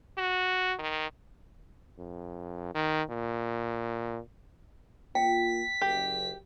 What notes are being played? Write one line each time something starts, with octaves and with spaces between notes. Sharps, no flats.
F#4
D#3
F2
D#3
A#2
A#3 F4 G5 B6
F#1 G4